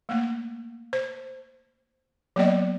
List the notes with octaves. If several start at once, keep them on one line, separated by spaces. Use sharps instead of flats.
A3 A#3
C5
F#3 A#3 B3 D5 D#5